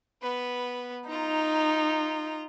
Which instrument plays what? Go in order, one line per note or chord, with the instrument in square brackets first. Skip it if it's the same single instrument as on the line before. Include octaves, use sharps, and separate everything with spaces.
[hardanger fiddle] B3 B4
[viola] D#4 [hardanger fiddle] F4 A#5